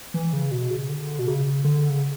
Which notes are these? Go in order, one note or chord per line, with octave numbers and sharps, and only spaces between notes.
E3
C#3
B2
C#3
D3
B2
C#3
D3
C#3